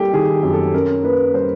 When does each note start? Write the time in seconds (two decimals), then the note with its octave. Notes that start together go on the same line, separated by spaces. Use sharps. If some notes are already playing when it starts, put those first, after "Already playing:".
Already playing: G3 A#3 G4 A4
0.14 D#3 G#4
0.43 F#2
0.53 A4
0.74 C#4 A#4
1.03 A#3 B4
1.34 G3 C5